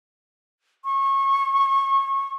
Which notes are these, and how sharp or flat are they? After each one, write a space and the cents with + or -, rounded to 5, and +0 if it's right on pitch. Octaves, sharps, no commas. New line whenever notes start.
C#6 -25